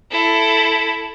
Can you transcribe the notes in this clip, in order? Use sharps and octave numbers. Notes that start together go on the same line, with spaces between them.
E4 A4